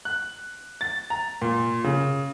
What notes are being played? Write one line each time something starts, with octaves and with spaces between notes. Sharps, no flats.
F#6
A6
A#5
A#2
C#3